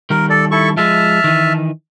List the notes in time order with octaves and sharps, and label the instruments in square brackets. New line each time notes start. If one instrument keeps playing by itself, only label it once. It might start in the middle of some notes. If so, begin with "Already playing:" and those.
[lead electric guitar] D#3 G3 [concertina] A#4
[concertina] A4 D5
E4 A4 C#6
[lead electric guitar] F3 G#3 [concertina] E5 A5 F6
[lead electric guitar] D#3 E3